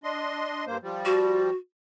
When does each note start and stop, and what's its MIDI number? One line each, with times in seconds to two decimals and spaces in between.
0.04 0.65 62
0.04 0.65 75
0.04 0.65 84
0.67 0.77 43
0.67 0.77 58
0.67 0.77 72
0.83 1.50 53
0.83 1.50 55
1.05 1.55 66